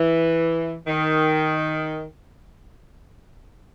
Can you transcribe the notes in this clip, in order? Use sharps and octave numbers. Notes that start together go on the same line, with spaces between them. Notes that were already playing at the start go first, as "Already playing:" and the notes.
Already playing: E3
D#3